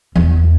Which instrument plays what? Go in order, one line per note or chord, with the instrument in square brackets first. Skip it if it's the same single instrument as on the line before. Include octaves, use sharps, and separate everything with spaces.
[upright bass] E2